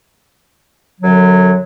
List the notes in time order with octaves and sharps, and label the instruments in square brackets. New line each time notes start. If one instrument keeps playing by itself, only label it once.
[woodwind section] F#2 D3 F#3